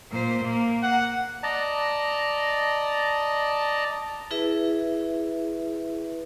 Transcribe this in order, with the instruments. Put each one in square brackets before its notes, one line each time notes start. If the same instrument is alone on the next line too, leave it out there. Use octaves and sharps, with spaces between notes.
[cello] A#2 C5
A#3
[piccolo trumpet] F#5
[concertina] D5 D#5 A5 A#5
[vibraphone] E4 G#4 B4 E5